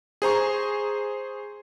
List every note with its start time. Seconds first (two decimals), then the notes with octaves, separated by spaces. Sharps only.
0.22 G#4 C5 A#5 C#6